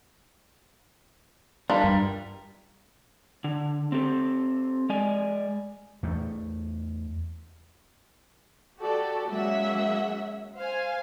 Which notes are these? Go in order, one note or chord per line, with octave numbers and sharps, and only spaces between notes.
G3 D4 F4 A#4
G2
D3
C4 G4 A4
G#3 D5 G#5
E2 A3
F#4 G4 A4 D5
F#3 G#3 A#3 C#4 E5 F#5
C5 F5 G#5